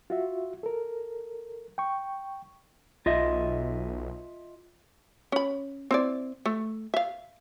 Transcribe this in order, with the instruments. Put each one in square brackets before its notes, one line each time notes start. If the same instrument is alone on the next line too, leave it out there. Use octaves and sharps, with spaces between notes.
[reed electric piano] F4 F#4 E5
A4 A#4
G5 C#6
[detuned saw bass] B1 [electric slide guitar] F4 D#5 E5
[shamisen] C#4 B5
C4 E4 D5
A3
E5 F5